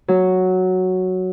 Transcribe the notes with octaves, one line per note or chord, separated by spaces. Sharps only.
F#3